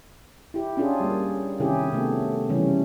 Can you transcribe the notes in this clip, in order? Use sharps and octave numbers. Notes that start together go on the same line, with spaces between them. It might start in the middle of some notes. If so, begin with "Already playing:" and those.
E4 G4
C#4 D4 F4 G4 G#4
G3 A#3
C3 D#3 C#4 E4 G4 G#4
C3 A3 B3
C#3 E3 G3 A3 C#4